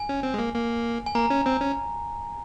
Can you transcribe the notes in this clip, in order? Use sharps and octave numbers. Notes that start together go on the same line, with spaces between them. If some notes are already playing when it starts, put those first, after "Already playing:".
Already playing: G#5
C#4
C4
G#3
A#3
A#3
G#5
A#3 A#5
C#4
C4
C#4